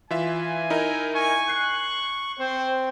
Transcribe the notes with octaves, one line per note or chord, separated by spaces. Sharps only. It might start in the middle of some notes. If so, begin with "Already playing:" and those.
E3 F4 E5 G#5
D#4 E4 A#4
G#5 C#6
F#6 C7
C4 C5